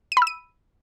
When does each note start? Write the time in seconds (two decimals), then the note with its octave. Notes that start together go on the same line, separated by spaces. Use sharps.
0.12 D#7
0.17 B5
0.22 E6
0.27 D#7